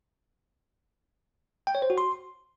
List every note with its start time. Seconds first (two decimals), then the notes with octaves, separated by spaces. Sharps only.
1.67 G5
1.75 C#5
1.82 C5
1.90 F#4
1.98 C6